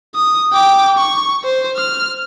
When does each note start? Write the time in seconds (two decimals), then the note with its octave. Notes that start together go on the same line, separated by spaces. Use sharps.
0.15 D#6
0.53 G5 D6
0.98 C#6
1.44 C5
1.76 F6